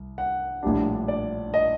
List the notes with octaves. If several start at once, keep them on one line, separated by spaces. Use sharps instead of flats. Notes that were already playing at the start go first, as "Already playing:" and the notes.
Already playing: C2
F#5
A#1 A2 G3 D4
D5
D#5